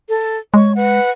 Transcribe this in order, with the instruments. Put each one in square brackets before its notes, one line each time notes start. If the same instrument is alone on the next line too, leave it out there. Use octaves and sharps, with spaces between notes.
[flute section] A4
[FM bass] G#3 [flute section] C#5 C#6
[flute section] B4 F#5